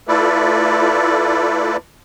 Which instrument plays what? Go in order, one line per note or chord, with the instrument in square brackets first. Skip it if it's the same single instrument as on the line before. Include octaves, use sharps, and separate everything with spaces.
[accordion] A3 E4 F4 A4 B4 D5